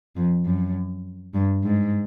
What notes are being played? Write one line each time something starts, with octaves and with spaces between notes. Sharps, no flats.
F2
F#2
G2
G#2